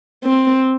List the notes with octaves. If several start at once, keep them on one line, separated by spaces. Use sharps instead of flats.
C4